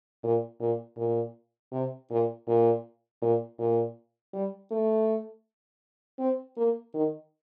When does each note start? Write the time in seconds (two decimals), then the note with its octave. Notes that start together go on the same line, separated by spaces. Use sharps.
0.24 A#2
0.60 A#2
0.98 A#2
1.72 C3
2.11 A#2
2.48 A#2
3.22 A#2
3.59 A#2
4.34 G3
4.71 A3
6.19 C4
6.57 A#3
6.95 D#3